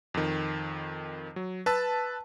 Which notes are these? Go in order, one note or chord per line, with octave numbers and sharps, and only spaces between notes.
F2 D#3
F#3
B4 A5 E6